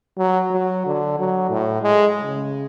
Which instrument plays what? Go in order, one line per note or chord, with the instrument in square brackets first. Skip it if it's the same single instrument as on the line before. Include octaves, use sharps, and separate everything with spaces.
[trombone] F#3
F#3
D3
F#3
A2
G#3
C#3